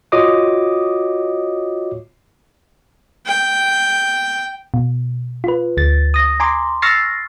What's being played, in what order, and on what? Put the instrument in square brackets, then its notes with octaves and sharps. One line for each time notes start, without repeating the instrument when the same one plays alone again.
[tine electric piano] F4 F#4 C#5 D#5 D6 D#6
[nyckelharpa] G5
[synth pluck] B2
F4 B4
D2 A6
D#6 A#6
G#5 A#5 C6 D6
C#6 E6 F6 A6 A#6 C7